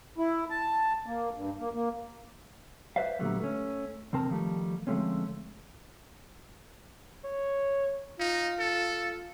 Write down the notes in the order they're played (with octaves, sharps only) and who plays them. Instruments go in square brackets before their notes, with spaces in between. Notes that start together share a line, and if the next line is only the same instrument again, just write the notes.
[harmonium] E4
A5
A#3
G2
A#3
A#3
[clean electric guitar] B4 C5 D5 E5 F5
A#2 D3 F#3 G3 A3 B3
A3 C#4
E2 C3 C4 A#4 A5
D#3 F3 G3 A3
D3 F3 G#3 A3 C4 C#4
[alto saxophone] C#5
[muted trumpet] D#4 [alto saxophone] F4
[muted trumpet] A4